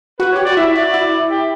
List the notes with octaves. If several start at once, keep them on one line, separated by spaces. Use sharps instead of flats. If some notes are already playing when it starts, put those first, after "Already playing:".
F#4 B4
G4 C#5
F#4 D5
E4 E5
F#4 D5
E4
G4